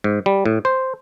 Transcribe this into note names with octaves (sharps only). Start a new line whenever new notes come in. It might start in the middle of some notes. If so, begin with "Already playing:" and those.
G#2
G3
A2
C5